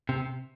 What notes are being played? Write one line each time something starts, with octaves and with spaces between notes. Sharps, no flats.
C3